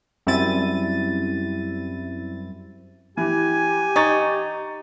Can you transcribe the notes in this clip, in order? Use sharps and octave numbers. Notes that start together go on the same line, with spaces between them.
F#2 G3 C4 E4 A6 D#7
E3 G4 G#5
D#4 C#6 A6